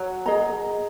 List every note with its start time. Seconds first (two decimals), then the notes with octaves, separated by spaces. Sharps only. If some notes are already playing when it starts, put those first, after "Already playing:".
Already playing: F#3
0.26 G#4 D#5 A#5